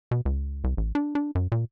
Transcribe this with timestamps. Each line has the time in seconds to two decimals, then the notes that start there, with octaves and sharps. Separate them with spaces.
0.11 B2
0.25 C#2
0.64 C2
0.77 A1
0.95 D4
1.15 D4
1.35 F#2
1.52 A#2